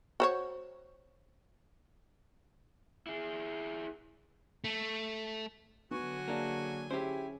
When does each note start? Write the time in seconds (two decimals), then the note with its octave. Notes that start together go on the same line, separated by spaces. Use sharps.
0.20 F#4 C5 C#5
3.07 E4 G#4
4.64 A3
5.91 D3 F#3 B3 F#4 G#5 C#6
6.28 A#3 D4 G#4 A#4 C#5
6.91 C#4 E4 G4 G#4 C5